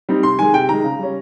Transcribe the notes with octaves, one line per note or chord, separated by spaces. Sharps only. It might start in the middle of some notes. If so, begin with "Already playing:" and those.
G3 C4 D#4
C3 C6
D#3 G#3 G#5
C3 G5
D#3 G#3 A#5
C#3
G3 C#4